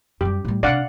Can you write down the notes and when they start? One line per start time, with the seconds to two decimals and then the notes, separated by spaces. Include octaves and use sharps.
0.21 F#2 G3 G4
0.45 A2 G3
0.63 C3 D4 D5 F5 F#5